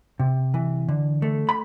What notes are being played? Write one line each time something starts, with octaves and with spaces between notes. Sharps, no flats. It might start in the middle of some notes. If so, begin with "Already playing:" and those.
C3
E3
D3
A3
B5